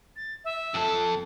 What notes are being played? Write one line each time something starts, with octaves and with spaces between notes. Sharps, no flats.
A6
E5
F2 A4